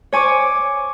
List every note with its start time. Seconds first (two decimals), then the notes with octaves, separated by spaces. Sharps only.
0.12 C#5 G#5 C#6 D6